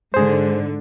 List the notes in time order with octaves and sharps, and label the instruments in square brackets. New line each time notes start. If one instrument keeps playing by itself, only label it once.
[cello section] G#2 D3 [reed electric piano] G#4 C5